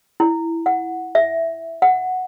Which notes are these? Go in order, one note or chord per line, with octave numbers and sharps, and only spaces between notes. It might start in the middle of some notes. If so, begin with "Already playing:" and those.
E4
F#5
E5
F#5